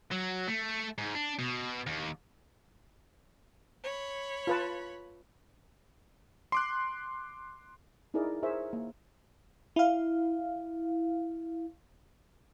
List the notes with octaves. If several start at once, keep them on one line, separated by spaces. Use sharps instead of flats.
F#3
A3
G#2
D4
B2
D#2
C#5 B5
F4 B4 A5
C6 D6 F#6
D#4 E4 G#4 A#4 D5
F4 G#4 A#4 C5 C#5 E5
A#3
E4 F5